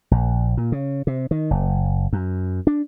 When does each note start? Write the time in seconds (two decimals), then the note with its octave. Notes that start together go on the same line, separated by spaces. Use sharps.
0.11 A#1
0.57 A#2
0.72 C#3
1.07 C3
1.31 D#3
1.51 F#1
2.13 F#2
2.67 D4